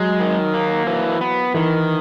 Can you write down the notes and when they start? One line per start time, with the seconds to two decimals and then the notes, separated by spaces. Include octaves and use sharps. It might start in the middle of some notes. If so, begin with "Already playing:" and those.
Already playing: F#3 G#3
0.20 D#3
0.54 A#3
0.87 E3
1.21 B3
1.54 D#3 E3